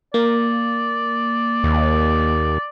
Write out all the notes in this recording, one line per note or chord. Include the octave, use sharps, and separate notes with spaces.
A#3 D5
D#2